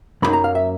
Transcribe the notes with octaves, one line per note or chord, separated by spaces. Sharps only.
F#2 C#3 F#3 A#3 D#4 B5
A#5
F5
E5